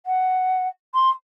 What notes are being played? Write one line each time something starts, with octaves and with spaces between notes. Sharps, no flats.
F#5
C6